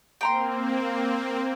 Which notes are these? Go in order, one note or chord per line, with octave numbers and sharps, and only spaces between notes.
A#3 C4 G5 A#5 C6